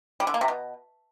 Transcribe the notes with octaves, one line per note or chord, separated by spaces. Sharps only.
G3
D3
A#3
C3
B2